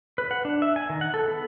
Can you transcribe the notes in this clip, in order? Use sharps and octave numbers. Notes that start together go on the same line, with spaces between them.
B4
F#5
D4
E5
G#5
D#3
F#5
A4
B3